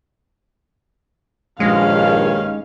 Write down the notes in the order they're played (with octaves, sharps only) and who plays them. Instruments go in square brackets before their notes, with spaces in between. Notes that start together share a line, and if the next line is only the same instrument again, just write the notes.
[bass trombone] A#1 [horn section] G2 D#3 C#4 [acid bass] G#3 [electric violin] F5